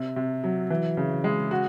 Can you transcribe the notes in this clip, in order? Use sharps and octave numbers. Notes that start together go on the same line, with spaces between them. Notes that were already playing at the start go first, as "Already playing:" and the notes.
Already playing: C3
C3
F#3
E3
C#3
G#3
F#4